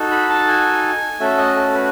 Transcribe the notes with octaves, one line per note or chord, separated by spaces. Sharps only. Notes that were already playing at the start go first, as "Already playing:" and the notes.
Already playing: D#4 F#4 A4
B5
A5
G#5
A3 C#4 F#4 A4 E5
D#5
A4
B4